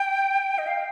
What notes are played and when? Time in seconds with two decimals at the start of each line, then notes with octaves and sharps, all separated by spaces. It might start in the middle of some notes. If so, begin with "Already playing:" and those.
Already playing: G5
0.58 D#5
0.67 F5